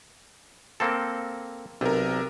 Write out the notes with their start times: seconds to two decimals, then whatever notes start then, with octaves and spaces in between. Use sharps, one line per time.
0.80 A#3 C4 A4
1.81 B1 C3 A#4